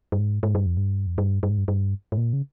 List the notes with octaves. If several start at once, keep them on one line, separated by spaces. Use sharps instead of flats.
G2
G#2
G#2
G2
F2
G2
F2
G2
G2
G#2
G2
G2
G#2
A#2
C#3